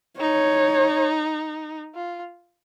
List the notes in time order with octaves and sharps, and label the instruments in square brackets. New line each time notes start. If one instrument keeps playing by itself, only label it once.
[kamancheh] D#4 [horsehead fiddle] C#5
[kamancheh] F4